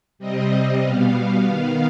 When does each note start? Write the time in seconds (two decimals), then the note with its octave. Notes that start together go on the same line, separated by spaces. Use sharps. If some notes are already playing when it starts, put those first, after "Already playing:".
0.19 C3 G3 C4 D#5
0.82 B2 G3 B3 F5
1.46 D#3 B3 F5